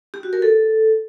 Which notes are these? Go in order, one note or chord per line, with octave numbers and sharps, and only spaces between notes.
G4
F#4
A#4
A4